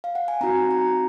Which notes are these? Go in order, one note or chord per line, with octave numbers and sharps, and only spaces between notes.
F5
F#5
G#5
C4 D#4 F#4 A#5
A#5